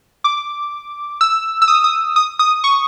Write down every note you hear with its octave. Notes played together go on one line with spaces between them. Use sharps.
D6
E6
E6
D#6
D#6
D#6
D#6
C#6